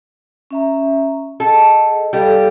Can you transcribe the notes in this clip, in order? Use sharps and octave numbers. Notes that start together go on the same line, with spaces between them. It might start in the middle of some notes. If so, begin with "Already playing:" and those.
C#4 E5 A#5
G#4 A4 D#5 F#5
G3 A4 D5 F5 G5